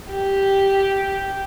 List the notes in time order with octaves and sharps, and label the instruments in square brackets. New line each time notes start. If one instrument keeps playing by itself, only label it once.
[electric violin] G4